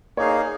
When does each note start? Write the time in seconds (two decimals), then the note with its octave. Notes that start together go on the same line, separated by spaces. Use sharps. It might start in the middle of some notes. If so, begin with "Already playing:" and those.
0.17 A#3 D#4 G#4 C#5 F5